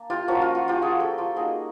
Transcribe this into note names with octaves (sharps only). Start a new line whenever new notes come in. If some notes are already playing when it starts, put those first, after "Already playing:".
Already playing: A#3 D4
F4 G4
F3 A#3 C#4 F4 F#4
F4
F#4
F4 G4
F#4 G#4
G4 A4
F4 G4
G3 A#3 D#4 F#4 G#4